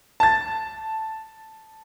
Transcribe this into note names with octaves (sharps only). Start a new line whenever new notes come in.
A5 A6